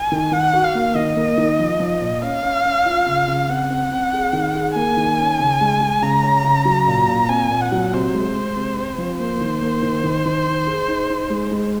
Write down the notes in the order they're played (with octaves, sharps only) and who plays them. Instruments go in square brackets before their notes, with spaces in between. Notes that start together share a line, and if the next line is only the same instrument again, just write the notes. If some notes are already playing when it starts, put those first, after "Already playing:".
Already playing: [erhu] G#5
[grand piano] D#3
[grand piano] D#3 [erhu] F#5
[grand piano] F#4
[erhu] F5
[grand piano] A#3
[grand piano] D#3 [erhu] D#5
[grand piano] A#3
D#3
F3
F3
A#2
[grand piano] C#4 [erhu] F5
[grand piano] C#4
C#4
F4
C#3
C#3
[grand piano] C4 [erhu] F#5
[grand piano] C4
C4
G#4
D#3
G#4
[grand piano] A#3 [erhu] G#5
[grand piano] D#3
C#4
C#3
G#3
G#3
[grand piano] C#3 [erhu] A#5
[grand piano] C#4
C#3
F#3
A#2
A#2
[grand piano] C4 [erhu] G#5
[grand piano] A#2
[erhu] F#5
[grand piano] F#3
[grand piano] C3 [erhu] C5
[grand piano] G#3
G#3
C3
C4
F3
[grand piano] A#3 [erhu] C5
[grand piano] D#3
A#3
D#3
D#3
D#3
D#4
G#4
D#4
D#4
G#3
G#3